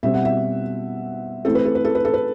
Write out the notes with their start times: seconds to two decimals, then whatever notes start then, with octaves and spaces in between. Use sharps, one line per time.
0.03 B2 G3 C4 E5
0.14 F#5
0.25 E5
1.45 E3 A3 C4 A4
1.55 B4
1.65 A4
1.75 B4
1.85 A4
1.95 B4
2.05 A4
2.14 B4